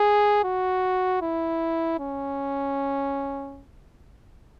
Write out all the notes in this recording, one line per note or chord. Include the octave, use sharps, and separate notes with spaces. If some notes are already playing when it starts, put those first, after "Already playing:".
Already playing: G#4
F#4
E4
C#4